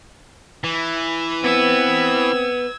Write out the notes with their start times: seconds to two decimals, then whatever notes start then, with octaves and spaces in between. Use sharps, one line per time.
0.64 E3
1.44 B3 C4 E6 G#6